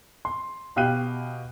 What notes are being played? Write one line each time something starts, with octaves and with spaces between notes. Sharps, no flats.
C6
B2 G4 F5 G5 F#6 D#7